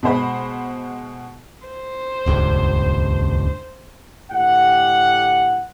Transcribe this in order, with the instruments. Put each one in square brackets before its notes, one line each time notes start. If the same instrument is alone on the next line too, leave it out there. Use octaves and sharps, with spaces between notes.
[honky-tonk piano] B2 G#3 C5 B5
[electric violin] C5
[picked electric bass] D#1 C#2 G2
[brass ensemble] A2 D3 G4 F#5